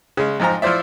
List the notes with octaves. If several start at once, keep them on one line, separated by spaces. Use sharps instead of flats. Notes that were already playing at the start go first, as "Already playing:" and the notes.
C#3 G#3
F2 G#2 F3 G#5 A#5
F3 E4 F4 C5 D5 E5